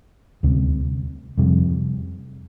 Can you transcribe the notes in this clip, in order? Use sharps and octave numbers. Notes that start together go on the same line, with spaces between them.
D2 C3 G3
F2 C3 G3